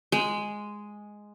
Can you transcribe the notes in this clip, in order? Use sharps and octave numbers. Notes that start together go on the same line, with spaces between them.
G#3